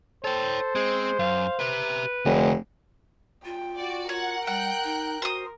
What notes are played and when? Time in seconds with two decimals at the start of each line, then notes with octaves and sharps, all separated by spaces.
0.24 A4 C5 C#5 G5
0.75 G#3 C4
1.19 F#2 F5
1.60 G4 B4 E5
2.25 F1 D2
3.45 F4 G5
3.77 F#4 D5
4.09 F4 A#4 C#5 F#5
4.47 G3 F#5 G5 F#6 G6
4.84 D#4
5.22 F#4 C5 D#6